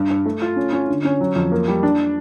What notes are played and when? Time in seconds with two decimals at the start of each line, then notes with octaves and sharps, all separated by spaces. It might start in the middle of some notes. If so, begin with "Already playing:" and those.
Already playing: G2
0.10 G2
0.26 A3
0.42 F4
0.56 C#4
0.73 C#4
0.89 D3
1.05 C#4
1.21 F#3
1.36 F2
1.52 A#3
1.68 G3
1.83 D4